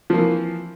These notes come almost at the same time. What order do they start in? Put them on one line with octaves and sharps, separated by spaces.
F3 A#3 E3